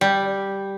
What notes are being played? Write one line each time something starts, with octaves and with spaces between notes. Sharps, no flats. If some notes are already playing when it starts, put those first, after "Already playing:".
G3